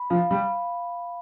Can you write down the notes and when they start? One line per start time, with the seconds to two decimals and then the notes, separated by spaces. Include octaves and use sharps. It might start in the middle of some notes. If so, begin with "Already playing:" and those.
Already playing: B5
0.10 F3 F5
0.31 G3 B5